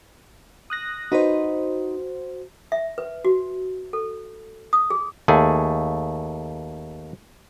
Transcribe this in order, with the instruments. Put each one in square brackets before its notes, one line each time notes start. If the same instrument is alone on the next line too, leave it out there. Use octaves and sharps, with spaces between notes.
[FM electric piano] D#6 F#6 A#6
[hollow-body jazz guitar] D#4 B4 [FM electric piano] F#4 C5
[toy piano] E5
B4
F#4
A4
D#6
G#4
[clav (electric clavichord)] D#2 A3 G#4